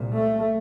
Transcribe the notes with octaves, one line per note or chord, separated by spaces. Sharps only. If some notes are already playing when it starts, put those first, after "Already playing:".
Already playing: C2 A#2
A3